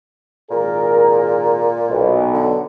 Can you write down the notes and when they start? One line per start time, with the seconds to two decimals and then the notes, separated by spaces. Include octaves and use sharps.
0.51 G#1 A#2 G#4 A#4
1.89 B1
2.33 D3